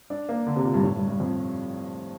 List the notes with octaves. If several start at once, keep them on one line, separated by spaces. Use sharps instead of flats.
D4
A#3
D3
C3
A#2
G2
A2
G2
G2
F2